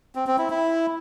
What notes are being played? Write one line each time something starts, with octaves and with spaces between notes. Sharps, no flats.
C4
C4
E4
E4